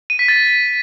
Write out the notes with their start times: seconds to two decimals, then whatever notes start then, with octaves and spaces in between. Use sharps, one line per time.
0.10 D#7
0.19 B6
0.28 A6